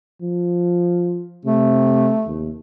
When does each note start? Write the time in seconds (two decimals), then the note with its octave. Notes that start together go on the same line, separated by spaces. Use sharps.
0.22 F3
1.45 C3 A3
2.27 D#2